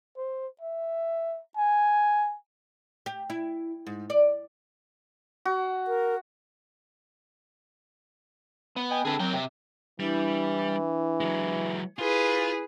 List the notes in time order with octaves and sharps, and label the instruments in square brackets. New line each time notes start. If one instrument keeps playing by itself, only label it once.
[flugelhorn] C5
E5
G#5
[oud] G4
E4
G#2
D5
[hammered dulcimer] F#4
[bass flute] A#4
[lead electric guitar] B3
[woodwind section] D#5 G5 G#5
[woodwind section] D3 C4 D4 [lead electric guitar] G#4 B4
[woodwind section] F#3 C4 [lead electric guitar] A#3 G5
[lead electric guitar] C3
[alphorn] E3 [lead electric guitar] G3 [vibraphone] D4 E4
[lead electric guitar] F#3 G#3
[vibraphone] E4 [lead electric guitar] F4 [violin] G#4 B4